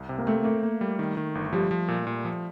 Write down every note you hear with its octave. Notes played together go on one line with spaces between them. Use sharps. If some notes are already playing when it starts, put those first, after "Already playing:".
Already playing: C2
C3
A#3
A3 C4
A3 A#3
A#3
G3
D#3
D#3
G1
F3 G3
F3
A#2
A#2
F3